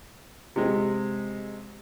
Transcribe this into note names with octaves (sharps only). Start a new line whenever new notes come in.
C3 G#3